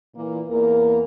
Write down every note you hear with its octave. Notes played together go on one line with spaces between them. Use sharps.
A#2 E3 A#3
E2 A#3 A#4